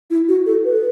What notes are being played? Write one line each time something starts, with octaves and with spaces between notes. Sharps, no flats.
E4
F#4
A4
B4